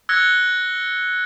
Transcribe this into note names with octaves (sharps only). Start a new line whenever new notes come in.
E6 F#6 G#6 A#6 C#7 G7